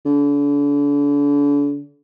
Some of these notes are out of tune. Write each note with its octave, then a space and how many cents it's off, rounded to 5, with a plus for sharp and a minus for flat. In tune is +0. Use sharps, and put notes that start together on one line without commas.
D3 -40